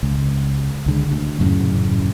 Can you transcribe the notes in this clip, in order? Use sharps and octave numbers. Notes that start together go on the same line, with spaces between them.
C#2
C#2 D3 G#3
D2
D#1 F#2 A2 C#3